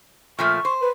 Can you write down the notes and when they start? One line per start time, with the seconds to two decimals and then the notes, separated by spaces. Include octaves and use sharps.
0.39 A#2 F3 A3 C#6
0.65 C5
0.81 B4